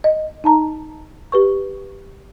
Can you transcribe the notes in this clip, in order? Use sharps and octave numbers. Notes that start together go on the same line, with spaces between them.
D#5
D#4 A5 A#5
G4 B4 C#6